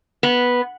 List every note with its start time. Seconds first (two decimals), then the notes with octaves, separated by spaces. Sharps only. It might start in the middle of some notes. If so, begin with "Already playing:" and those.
0.23 B3